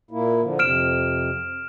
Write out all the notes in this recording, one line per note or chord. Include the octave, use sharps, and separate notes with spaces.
A#2 A#3 E4
D3 F3
F2 C3 F6 D7 E7